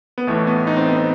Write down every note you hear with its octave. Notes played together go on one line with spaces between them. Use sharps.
B3
A1 A2 E3 A3
B3
D#4
C4
B3
C4